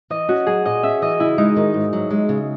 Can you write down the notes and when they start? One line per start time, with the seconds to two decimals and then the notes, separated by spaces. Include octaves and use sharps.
0.10 E3 D#5
0.28 C#4 F#4
0.46 F#3 G#4
0.65 A#2 D#5
0.83 C#4 E5
1.02 E3 D#5
1.20 C#3 E4
1.38 G#3 D#4
1.56 D#3
1.74 G#2
1.93 F#3
2.10 G#3
2.29 C#3